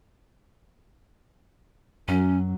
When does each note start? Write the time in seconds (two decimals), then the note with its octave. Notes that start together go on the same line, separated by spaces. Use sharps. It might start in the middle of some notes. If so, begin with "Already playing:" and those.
2.08 F#2 F#3 C#4